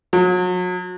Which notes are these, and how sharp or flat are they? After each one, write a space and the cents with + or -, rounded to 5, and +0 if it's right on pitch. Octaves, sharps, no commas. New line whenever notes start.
F#3 -35